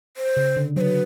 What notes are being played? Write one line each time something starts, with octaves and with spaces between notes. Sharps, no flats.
C5
C#3
D3
F#3 C5
B4